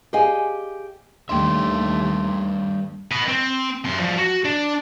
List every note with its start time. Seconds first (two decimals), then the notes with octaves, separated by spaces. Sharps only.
0.13 G4 G#4 D5 D#5 F5 G#5
1.29 D#2 G3 A3 D4 E5 G5 C6
3.11 B4 D#5
3.28 C4
3.85 F#2 C6
3.99 F3 G3
4.17 F#4
4.44 D4